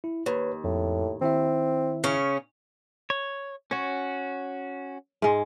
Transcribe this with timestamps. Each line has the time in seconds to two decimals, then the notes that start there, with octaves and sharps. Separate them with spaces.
0.04 E4
0.26 D#2 B4 C#5
0.64 F2 A2
1.21 D#3 C4 E4 E5
2.04 C#3 C#4
3.10 C#5
3.71 C#4 F#4 C#5
5.22 G#2 G#3